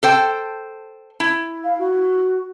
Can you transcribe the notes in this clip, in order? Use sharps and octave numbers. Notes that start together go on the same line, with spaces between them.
A4 C5 G5
E4
F5
F#4